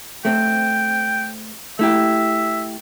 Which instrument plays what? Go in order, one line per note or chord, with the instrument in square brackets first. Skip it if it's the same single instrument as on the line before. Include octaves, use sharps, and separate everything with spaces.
[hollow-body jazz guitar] A3 C4 [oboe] G5
[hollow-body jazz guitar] A3 E4 G4 [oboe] E5